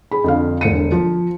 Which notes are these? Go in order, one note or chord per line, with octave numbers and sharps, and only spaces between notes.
G#4 B5
F2 D3 F5
E1 D3 C#7 D#7
F3